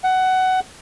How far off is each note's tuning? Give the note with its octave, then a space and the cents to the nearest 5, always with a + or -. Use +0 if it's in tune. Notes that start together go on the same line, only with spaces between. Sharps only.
F#5 +15